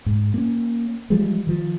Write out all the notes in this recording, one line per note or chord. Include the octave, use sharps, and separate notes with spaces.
G#2
A#3 C#4
E3 F3 G3 G#3
D#3 F3